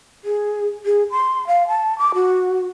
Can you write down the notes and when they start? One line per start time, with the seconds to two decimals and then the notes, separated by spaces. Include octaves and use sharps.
0.24 G#4
0.86 G#4
1.11 C6
1.47 F5
1.68 A5
1.98 D6
2.15 F#4